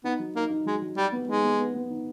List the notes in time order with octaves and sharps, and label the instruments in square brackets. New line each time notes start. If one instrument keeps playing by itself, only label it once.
[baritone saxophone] B3 [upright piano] D#4
[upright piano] F#3
[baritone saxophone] A#3 [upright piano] D#4
[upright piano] D#4
[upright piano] F#3 [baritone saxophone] G#3
[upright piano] F#3
[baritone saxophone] G3 [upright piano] F#4
[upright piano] B3
[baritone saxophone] G#3 [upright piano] D#4
[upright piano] B3
B3
B3
D#4